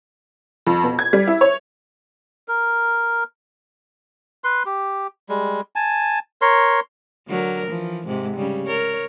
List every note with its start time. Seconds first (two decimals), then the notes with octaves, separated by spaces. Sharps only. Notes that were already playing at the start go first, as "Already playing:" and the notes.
0.67 F2
0.83 B2
0.99 G#6
1.13 G3
1.27 E4
1.41 C#5
2.48 A#4
4.44 B4 C6
4.66 G4
5.29 G3 G#3
5.76 G#5 A5
6.42 A#4 C#5 C6
7.28 D3 F#3 A#4
7.68 E3 F3
8.06 G#2 C3
8.36 C#3 G3
8.66 A#4 C#5